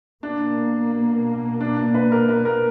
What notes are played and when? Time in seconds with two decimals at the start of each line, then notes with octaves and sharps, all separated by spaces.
0.23 B2 A#3 D4
1.61 D4
1.77 D4
1.94 B4
2.12 A#4
2.29 B4
2.45 A#4